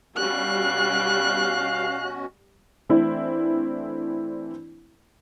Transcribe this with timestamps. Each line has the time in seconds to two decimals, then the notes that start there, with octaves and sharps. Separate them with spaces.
0.17 B2 G3 C#4 F#4 F5 F#6
2.89 E3 A3 C4 D4 E4